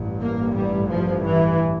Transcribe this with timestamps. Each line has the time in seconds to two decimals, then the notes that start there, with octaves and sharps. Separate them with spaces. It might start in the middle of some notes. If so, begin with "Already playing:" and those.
Already playing: A1 G2
0.22 A#3
0.56 G3
0.90 F3
1.25 E3